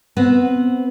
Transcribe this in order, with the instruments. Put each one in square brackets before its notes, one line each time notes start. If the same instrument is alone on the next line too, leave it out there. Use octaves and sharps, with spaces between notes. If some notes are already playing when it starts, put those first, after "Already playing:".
[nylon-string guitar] B3 C4